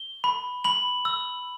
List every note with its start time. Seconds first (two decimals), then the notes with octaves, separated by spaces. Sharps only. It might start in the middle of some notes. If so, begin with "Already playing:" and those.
Already playing: G7
0.24 B5
0.64 B5 F#7
1.05 E6